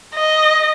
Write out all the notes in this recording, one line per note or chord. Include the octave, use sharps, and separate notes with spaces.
D#5